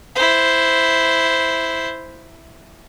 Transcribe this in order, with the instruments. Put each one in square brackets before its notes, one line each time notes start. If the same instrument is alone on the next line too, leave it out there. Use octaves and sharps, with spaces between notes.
[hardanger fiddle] E4 C5